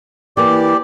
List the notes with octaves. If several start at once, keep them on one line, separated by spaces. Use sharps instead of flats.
E3 A#3 B3 G4 D5